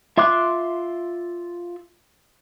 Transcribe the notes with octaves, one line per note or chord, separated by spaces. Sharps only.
F4 E5 C6 D6 F#6